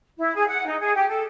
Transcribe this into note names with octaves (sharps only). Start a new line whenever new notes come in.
E4
G#4
F#5
D#4
G#4
G4
A4